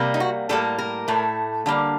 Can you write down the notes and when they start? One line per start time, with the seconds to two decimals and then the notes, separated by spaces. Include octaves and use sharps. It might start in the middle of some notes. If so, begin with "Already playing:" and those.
Already playing: C3 G3 A#3
0.14 D#4
0.20 F#4
0.49 A2 G3 A#3 A4
0.79 A#4
1.08 A2 A3
1.66 D3 G3 A#3